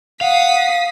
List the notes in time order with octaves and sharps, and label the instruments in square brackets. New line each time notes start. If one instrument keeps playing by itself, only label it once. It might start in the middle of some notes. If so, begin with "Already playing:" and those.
[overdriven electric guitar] F5 [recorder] F#5 [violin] D#6 B6